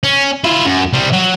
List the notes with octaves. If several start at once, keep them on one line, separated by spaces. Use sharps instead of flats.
C#4
E4 F4
F#2
C3 G3
F#3